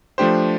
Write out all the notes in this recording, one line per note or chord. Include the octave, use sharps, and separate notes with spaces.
F3 A3 D4 G4 C5